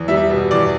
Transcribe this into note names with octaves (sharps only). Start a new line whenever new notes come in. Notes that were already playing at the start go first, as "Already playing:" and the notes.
Already playing: E2
G3 E5
B2
E2 D5